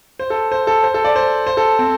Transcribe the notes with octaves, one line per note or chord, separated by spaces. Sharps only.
C5
A4
C5
A4
C5
A4
D5
C5
C5
A4
C4